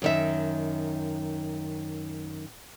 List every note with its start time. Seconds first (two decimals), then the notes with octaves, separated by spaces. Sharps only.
0.02 F#2 D#3 E5